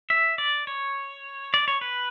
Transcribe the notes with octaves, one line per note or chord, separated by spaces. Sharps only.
E5
D5
C#5
D5
C#5
B4